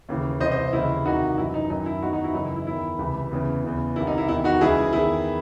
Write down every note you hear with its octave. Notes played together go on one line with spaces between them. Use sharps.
D#2 C#3 E3
C2 C3 E3 C5 D#5
C5 D#5
D#2 C#3 E3 E4
C2 C3 D#3 D#4 F#4
F#2 E3 E4
D#4
F#2 D#3 D#4
E4
E2 D#3 D#4 F#4
D#4 F#4
E4
F#2 C#3 E3 D#4
E4
E4
E2 D#3 E4
C#2 C3 E3
E2 C#3 E3
E2 C#3 E3
C2 C3 D#3 E4
D#4
E4
E2 D#3 E4
D#4 F#4
C#2 C#3 E3 E4 G#4
E2 D#3 E4 G#4